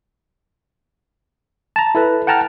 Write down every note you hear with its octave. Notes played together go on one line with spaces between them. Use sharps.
A5 A#5
E4 A4 B4
F#5 G5 A5 A#5 F6